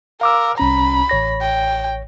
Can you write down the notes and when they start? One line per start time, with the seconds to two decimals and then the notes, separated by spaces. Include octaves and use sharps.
0.21 A#4 F5 D6 E6
0.58 C2 C#4 A#5 B5
1.09 A1 C#5 A#6
1.41 G5